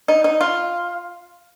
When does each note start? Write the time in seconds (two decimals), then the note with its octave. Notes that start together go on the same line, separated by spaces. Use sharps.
0.08 D#4
0.24 D#4
0.41 F4